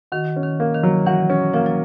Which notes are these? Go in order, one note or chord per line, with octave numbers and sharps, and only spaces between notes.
D#3 F#4
C#4
D#3
A#3
D#3
F#3
E3 F#4
C#4
F3 A#3
F#3